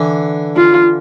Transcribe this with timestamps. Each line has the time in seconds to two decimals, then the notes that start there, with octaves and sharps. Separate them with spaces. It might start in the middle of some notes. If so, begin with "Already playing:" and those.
Already playing: D3 E3
0.56 F4